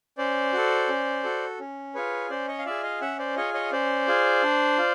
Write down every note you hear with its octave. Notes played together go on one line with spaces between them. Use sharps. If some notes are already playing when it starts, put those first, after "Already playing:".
C#4 C5 D5
F#4 A4
C#4
F#4 A4
C#4
F4 G#4 B4 C#5
C#4 C5 D5
C#5 D#5
F5
F4 G#4 D5 E5
D#5 F5
C#4 E5 F#5
C5 D5
F4 G#4 C#5 D#5
C#5 D#5
C#4 C5 D5
F4 G#4
D4
F4